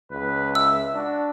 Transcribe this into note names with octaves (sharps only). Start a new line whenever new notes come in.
C#2 B4
E5 E6
D4 F#4